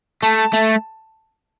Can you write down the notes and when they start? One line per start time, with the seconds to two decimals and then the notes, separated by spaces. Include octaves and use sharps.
0.23 A3 A5
0.53 A3